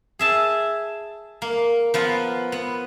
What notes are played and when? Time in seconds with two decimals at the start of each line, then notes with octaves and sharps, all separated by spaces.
0.19 G#4 E5 A5
1.42 A#3
1.94 F3 B3 F4
2.52 B3